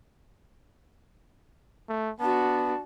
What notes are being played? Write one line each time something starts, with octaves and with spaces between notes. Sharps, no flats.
A3
B3 D4 F#4 A5